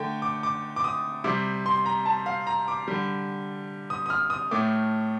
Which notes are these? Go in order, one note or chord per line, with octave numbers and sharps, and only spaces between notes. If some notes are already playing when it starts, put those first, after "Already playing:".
Already playing: D3 A3 G5
D6
D6
D6
D#6
C3 G3 D6
C6
A#5
A5
F5
A#5
D6
D3 G3
D#6
D#6
F6
D#6
A2 A3 D6